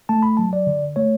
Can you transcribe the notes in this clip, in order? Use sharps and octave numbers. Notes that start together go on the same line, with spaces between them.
A3 A5
B5
F#3 A5
D5
D3
A3 C#5